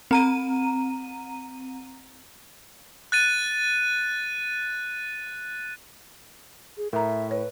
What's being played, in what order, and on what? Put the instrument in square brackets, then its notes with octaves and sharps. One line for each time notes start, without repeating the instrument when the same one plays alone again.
[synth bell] C4 A#5 D#7
[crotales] F#6 A6 D#7
[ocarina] G#4
[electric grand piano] A2 [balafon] A#4 A#5 [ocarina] E5
[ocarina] B4 [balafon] C#5